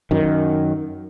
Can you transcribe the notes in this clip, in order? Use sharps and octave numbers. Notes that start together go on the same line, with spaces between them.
F#2 D#3